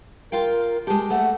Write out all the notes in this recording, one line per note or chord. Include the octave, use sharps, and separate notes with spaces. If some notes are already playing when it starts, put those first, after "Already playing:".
F4 A#4 F5 G5
G#3 G4 A5
A3 F#5